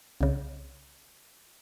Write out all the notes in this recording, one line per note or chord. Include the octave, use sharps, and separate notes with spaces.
C2 C#3